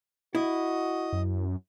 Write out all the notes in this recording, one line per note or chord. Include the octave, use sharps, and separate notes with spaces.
E4 F#4 D#5
F#2